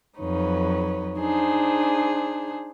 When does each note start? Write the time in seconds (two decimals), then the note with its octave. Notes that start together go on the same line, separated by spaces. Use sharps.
0.19 F2 F#3 D#4 B4 C#5
1.19 D4 D#4 G#4 C5